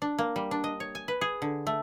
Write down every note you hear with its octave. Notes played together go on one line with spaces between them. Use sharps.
D4
A#3
G3
D4
D#5
C#5
G#5
B4
G#4
D3
A3